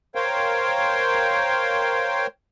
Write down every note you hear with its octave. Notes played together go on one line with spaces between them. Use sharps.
A#4 C5 C#5 F5 G5